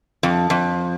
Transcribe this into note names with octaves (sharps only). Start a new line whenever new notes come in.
F2
F2